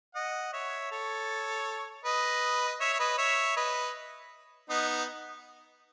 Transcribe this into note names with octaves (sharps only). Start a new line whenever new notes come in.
D#5 F#5
C#5 E5
A4 C#5
B4 D#5
C#5 E5
E5
B4 D#5
C#5 E5
B4 D#5
B3 D#4